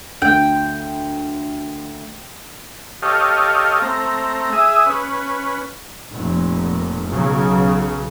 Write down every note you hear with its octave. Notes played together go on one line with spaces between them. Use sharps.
D2 G5
G4 A4 C#5 D#5 F5
A3 C4 A#5
G#4 E5 D#6
C#4 B4
F1 A#2
B1 C#3 F#3